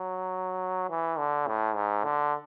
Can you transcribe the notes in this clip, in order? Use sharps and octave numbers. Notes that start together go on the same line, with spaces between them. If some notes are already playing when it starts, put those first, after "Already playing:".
Already playing: F#3
E3
D3
A2
G#2
D3